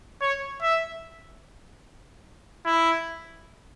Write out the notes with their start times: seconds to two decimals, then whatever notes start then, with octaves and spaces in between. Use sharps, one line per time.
0.21 C#5
0.62 E5
2.66 E4